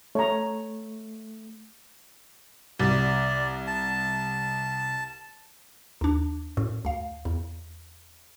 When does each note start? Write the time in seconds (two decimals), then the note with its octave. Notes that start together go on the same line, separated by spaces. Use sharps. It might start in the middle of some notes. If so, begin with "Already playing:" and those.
0.15 A3 C#5 A#5
2.80 C2 D5
3.67 A5
6.01 D#2 D4
6.57 F#2 A2
6.85 D2 F5
7.25 E2